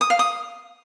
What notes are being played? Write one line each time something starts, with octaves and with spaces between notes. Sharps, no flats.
D#6
F5
D#6